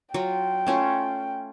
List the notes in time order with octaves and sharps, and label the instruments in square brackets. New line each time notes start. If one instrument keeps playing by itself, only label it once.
[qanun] F#3 F4 [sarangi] G5
[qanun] A3 C#4 F4